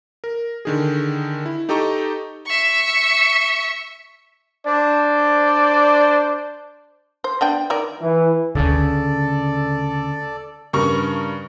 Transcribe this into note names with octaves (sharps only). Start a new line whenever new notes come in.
A#4
D3 D#3 G#4
E4
D#4 G4 A4 D#5 A#5 C#6
E5 C#6
D4 C5 D5
C5
B3 D4 G5
D#3 A#4 D5
E3
D2 C#3 A4 D5
G2 C#3 A#4 C#6